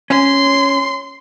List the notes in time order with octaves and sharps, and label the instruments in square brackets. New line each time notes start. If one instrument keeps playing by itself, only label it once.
[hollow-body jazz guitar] C#4 [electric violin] C6